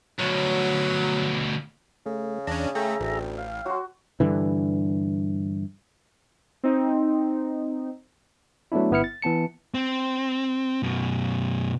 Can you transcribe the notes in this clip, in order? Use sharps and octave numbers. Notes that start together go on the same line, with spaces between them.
D2 B2 F#3
C#3 A3
E2 C#4 D4 A#5
A3 G#4 E5 G5 A#5
A1 D2
F5
F#3 F#4 C6
G2 D3 E3
C4 D#4
F#3 A3 B3 D4 E4
G1 B3 E4 F6 C#7
A6
E3 B3 A5 C#7
C4
F#2 B2